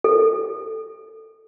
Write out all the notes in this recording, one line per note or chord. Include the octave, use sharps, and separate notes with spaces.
A4